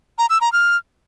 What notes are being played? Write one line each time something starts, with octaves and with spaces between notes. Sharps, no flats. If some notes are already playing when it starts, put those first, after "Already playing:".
A#5
E6
A#5
F6